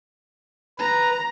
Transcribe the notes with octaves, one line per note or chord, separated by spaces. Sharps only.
B4 A#5